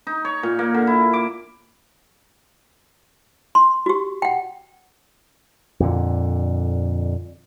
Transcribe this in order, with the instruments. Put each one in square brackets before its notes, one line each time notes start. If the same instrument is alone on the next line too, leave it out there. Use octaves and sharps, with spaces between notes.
[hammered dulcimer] D#4
C#5
A#2
A#3
D3
E4
D6
[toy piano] C6
F#4 G4
F#5 G5
[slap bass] F2 A#2 D3